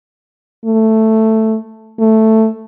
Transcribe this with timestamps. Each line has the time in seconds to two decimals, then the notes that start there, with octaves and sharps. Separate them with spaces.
0.65 A3
1.99 A3